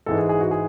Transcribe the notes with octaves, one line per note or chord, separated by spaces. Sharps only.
G#2 E3 G#3 A4
G#4
G#4
F#4
G#4